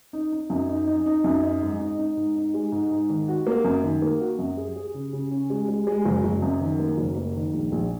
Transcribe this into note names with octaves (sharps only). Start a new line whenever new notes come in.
D#4
D#4
F#2
D#4
D#4
D#4
F#2
D#4
G#2
D#4
D#4
G#2
D#4
G#3
G#2
G#2
D#3
F#4
A#3
F#2
D#3
A#3
F#4
F#2
G#4
G#4
C#3
C#3
C#4
G#3
G#3
G#3
F#1
F#1
F#2
D#3
A#3
F#1
A#3
D#3
A#1
A#1